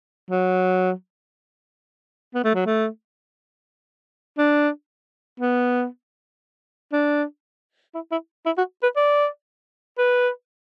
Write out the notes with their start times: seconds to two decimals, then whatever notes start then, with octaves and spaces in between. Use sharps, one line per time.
0.30 F#3
2.34 B3
2.44 A3
2.55 F#3
2.66 A3
4.38 D4
5.40 B3
6.93 D4
7.95 E4
8.11 E4
8.46 E4
8.58 F#4
8.83 B4
8.96 D5
9.98 B4